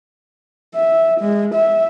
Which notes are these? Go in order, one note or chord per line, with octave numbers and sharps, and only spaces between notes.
E5
G#3
E5